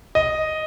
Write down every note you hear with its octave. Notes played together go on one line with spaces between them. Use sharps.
D#5